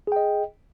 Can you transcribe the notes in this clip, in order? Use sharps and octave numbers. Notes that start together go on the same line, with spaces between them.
G#4 D#5 G5